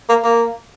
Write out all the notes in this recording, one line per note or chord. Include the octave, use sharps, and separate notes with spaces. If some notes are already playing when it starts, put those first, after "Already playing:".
A#3
A#3